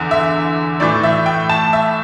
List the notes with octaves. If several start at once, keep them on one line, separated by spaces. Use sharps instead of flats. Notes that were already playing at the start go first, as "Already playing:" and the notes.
Already playing: E2 D3
E5
A2 E3 D5
E5
G5
A5
E5